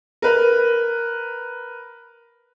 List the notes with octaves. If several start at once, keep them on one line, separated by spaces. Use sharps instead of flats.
A#4 B4